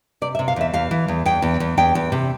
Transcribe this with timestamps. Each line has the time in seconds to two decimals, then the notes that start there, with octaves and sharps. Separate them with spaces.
0.21 C3 D5
0.35 E5
0.39 C3
0.48 F5
0.56 E2 E5
0.74 E2 F5
0.91 E3
1.08 E2
1.26 E2 G5
1.42 E2
1.60 E2
1.78 E2 G5
1.95 E2
2.12 C3